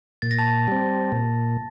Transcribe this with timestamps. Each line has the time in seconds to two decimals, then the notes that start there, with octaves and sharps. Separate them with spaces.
0.22 A#2 A6
0.31 A#6
0.39 A5 A6
0.68 G3 C4
1.12 A#2